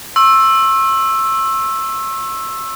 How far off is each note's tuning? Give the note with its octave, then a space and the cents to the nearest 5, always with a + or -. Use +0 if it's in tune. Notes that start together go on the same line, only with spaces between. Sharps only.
C#6 -45 E6 +0